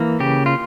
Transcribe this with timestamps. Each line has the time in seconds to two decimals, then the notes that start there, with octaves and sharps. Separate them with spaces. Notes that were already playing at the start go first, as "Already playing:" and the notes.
Already playing: E3 A#3
0.20 C#3 G4
0.46 F4